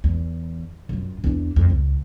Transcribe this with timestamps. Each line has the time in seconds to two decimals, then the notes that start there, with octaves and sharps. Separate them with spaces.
0.04 E2
0.89 F#2 F4
1.24 E2 D4
1.56 F2
1.70 C#2